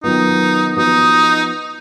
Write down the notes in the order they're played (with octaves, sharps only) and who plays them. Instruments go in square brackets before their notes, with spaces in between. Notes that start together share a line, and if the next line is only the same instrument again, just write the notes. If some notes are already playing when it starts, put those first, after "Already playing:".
[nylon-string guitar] D#3 F#3 B3 F4 [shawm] D#4
[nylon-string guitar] F3 B3 F#4 [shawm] D#4